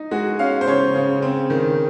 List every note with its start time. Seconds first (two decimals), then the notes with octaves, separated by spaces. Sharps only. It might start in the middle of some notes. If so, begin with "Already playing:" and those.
Already playing: D#4
0.11 G#3 F#4
0.39 C#4 F5
0.61 C5
0.67 C#3 C#5
0.96 C#3
1.22 C4
1.50 D#3